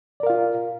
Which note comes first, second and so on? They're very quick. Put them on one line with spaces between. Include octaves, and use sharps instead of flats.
D5 A#4 F5 F4